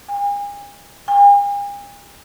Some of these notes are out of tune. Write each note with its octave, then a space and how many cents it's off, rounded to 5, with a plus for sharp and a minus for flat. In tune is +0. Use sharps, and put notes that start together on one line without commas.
G#5 -40
G#5 -45